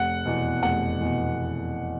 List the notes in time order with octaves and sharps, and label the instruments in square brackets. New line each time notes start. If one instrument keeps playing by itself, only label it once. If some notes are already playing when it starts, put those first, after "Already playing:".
Already playing: [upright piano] F1 [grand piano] F#5
[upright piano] E2 B2
[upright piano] F1 [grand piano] F#5
[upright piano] E2 B2